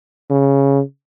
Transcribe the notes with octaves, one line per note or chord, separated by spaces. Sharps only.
C#3